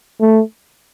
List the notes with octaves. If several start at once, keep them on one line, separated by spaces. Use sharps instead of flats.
A3